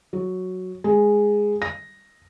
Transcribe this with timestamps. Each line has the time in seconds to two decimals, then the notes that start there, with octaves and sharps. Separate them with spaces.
0.13 F#3
0.84 G#3
1.62 A#6